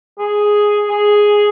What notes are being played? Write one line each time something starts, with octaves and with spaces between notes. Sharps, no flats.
G#4
G#4